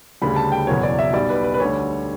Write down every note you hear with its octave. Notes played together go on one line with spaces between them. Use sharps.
D2 C#3 G3 B5
A5
G5
F#1 E2 B2 F#3 C#5
D5
E5
B1 B2 G3 D5
B4
B4
B4
D2 D3 G3 C#5